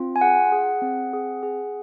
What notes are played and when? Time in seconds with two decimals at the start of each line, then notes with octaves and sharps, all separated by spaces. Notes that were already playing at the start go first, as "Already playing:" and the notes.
Already playing: C4 F4
0.16 G#5
0.21 G#4 F#5
0.52 G#4
0.82 C4
1.13 G#4
1.43 G#4